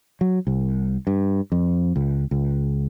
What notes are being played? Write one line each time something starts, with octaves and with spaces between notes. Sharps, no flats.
F#3
C2
G2
F2
C#2
C#2